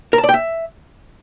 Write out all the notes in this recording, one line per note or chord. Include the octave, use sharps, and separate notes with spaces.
A#4
A5
D5
G5
E5